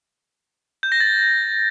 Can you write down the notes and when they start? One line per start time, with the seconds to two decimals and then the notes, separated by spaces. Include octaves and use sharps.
0.83 G6
0.92 A#6
1.00 A6